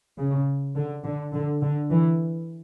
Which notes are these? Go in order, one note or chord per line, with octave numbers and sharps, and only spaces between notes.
C#3
D3
D3
D3
D3
E3